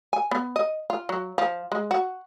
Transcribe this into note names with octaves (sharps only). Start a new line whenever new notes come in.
G#5
B3
D#5
F4
F#3
F3
G#3
F#4